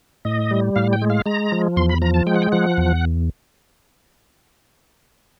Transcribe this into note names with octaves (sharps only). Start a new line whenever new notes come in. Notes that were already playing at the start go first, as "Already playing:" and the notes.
A2 D#5
G3
A2 F5
G5
G#3
F5
G#3 A#5
F3
E2 C6
B5
F3 A#5
A5
G#3 G5
F#5
G5
F3 F#5
E2